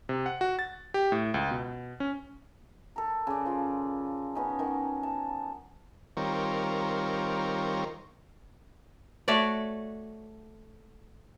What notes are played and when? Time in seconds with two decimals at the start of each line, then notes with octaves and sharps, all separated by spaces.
0.09 C3
0.26 F#5
0.41 F#4
0.59 A6
0.94 G4
1.12 A2
1.34 C#2
1.51 B2
2.00 C#4
2.96 A4 A#4
3.27 C#3 D5
3.45 F3 F4
4.35 B3 C#4 D#4
4.59 D#3 F#3 F#5
5.03 A5
6.17 D#3 G3 C4 F4 A#4 C#5
9.28 A3 F#4 C#5 D5